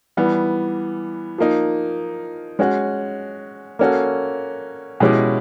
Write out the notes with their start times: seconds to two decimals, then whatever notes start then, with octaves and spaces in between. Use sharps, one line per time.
0.17 E3 G3 B3
1.38 F3 A#3 D#4
2.59 G#3 C#4 F#4
3.79 A#3 C#4 F#4 A4
5.00 B2 G#3 C#4 E4 G4